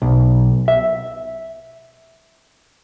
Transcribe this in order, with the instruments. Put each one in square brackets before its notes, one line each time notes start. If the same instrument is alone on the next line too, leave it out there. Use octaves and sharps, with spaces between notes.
[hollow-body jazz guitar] B1
E5